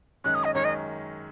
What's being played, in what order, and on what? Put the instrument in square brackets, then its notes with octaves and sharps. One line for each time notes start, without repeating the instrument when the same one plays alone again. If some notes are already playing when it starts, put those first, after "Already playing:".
[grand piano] F#2 D#3 G#3 C#4 [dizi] F#6
[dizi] D#6
D#5
[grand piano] F#2 D#3 G#3 C#4 [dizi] C#5
[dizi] D#5